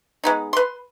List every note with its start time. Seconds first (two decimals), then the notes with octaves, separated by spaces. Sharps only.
0.24 G#3 B3 D#4
0.53 B4 C6